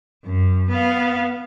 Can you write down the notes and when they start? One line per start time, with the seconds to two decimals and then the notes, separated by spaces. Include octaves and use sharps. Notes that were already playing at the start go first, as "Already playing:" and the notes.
0.25 F#2
0.70 B3 F5